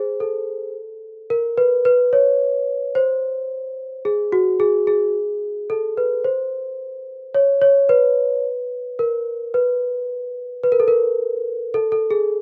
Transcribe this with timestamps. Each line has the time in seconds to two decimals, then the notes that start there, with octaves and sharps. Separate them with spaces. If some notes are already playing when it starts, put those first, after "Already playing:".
Already playing: G#4 C5
0.20 A4
1.30 A#4
1.58 B4
1.85 B4
2.13 C#5
2.95 C5
4.05 G#4
4.32 F#4
4.60 G#4
4.87 G#4
5.70 A4
5.97 B4
6.24 C5
7.34 C#5
7.62 C#5
7.89 B4
8.99 A#4
9.54 B4
10.63 B4
10.72 A#4
10.80 A4
10.88 A#4
11.74 A4
11.92 A4
12.11 G#4